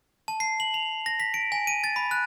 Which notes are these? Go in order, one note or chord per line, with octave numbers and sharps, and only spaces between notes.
A5
C7
F#7
F7
A#6
B6
D7
G#5
D#7
A6
B5
F#6